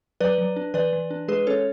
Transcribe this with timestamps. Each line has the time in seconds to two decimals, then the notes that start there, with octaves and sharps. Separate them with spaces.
0.20 F#3 B4 D5
0.38 F#3
0.56 D4
0.74 E3 B4 D5
0.93 E3
1.11 D4
1.28 G#3 G#4 B4
1.47 C#4 A4 C#5